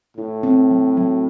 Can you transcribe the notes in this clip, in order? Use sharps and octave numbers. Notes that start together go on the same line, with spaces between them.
A2 E4
C4
F#3
F#3